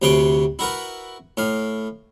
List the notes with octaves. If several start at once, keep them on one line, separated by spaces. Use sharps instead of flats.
D2 C3 B4 C#5 C6 D6
E4 F#4 A#4 B4
A2 F5